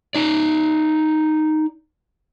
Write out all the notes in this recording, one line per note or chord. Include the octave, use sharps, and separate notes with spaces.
D#4 D5